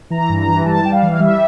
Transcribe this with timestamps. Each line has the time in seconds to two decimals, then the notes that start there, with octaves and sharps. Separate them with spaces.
0.10 E3 A#5
0.29 G2
0.38 A#5
0.48 E3
0.65 G3 A5
0.83 G3 G5
0.92 F5
1.02 E3
1.13 F5
1.20 G3 E5